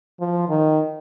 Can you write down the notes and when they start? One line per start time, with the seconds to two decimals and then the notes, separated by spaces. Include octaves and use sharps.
0.20 F3
0.49 D#3